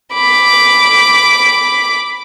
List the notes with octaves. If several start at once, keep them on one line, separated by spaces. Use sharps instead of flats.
B5 D6